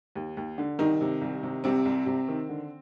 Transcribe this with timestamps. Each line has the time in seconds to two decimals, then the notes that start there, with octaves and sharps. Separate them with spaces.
0.16 D#2
0.37 D#2
0.58 D3
0.79 C2 D#3 D#4
1.01 C3
1.21 C2
1.43 C3
1.64 C2 C3 C4
1.85 C2
2.06 C3
2.28 D#3
2.49 D3